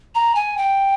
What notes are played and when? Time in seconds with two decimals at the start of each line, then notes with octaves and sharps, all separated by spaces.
0.15 A#5
0.35 G#5
0.57 G5